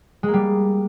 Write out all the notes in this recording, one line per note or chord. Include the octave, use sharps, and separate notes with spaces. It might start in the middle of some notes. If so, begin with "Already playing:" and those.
G#3
A#3
G3